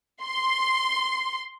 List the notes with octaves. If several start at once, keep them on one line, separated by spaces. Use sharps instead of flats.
C6